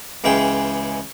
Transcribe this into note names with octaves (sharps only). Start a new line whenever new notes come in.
C#2 C#3 E3 G#3 G#4 G5